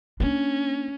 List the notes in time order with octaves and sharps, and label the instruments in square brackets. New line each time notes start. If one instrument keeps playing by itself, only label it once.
[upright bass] A#3 D4 [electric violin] C#4